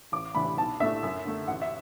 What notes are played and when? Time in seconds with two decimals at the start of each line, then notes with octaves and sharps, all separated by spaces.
0.12 A1 D6
0.35 A2 E3 D4 B5
0.58 B1 A5
0.80 A2 A3 D4 E5
1.03 F#2
1.25 D3 A3
1.48 A1 F#5
1.62 E5